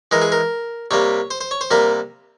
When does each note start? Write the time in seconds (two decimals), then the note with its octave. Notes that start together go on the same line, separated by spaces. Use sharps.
0.11 E3 G#3 A#4
0.22 G#4
0.32 A#4
0.91 C3 G3 A#3 C#5
1.31 C5
1.41 C5
1.51 C#5
1.61 C5
1.71 C3 G3 A#3 A#4